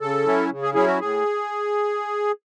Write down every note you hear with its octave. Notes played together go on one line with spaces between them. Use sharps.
C#3 A4
F#3 C#4 E4
C#3
G#4
F#3 C#4 E4 G#4
F#4
A2 G#4